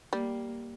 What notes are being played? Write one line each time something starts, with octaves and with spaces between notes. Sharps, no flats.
G3 A#3